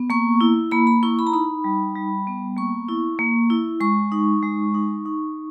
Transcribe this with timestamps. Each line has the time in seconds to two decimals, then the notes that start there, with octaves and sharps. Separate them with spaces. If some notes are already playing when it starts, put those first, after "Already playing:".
Already playing: B3
0.10 A#3 C#6
0.41 E4
0.71 A#3 B5
0.87 B5
1.03 E4 C#6
1.19 B5
1.27 A#5
1.33 D#4 B5
1.64 G3
1.95 G3
2.27 B3
2.57 A#3 C#6
2.89 E4
3.19 A#3
3.50 E4
3.80 G#3 C#6
4.12 D#4
4.42 G#3
4.74 D#4
5.05 D#4